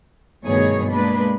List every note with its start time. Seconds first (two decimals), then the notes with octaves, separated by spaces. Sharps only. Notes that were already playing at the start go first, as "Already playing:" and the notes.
0.43 G2 B2 D#3 A3 G#4 C#5
0.90 G#3 A#3 D4 B4